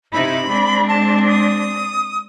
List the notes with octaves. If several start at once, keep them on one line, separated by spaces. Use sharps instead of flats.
C3 D#4 E4 B5
G#3 C4 D4
A5
D#6